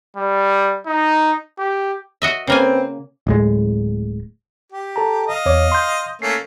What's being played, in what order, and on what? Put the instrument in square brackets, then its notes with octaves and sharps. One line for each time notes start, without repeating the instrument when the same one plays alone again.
[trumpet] G3
D#4
G4
[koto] F#4 D#5 E5
[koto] C#3 A#3 G#5 [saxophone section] C4 B4
[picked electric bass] D1 A2 G#3
[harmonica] G4
[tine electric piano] A4 A5 A#5
[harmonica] D#5 F5
[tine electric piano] E2 C#5 D6
C6 G6
[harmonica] A3 A#3 C#4 [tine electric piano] C7